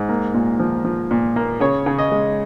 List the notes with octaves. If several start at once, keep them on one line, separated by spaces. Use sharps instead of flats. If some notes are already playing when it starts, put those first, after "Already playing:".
Already playing: G#2
A#3
A#2
F3
F3
A#2
A#3
C#3 C#5
C#3
D#5
G#3